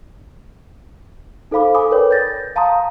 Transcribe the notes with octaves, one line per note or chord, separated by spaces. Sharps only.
D#4 A4 C5 F5 B5 D6
A4 G#5 B5 D6 D#6
A#4 B4 C#5 D5 G5
G6 A6 A#6
F5 A5 A#5 C6 D#6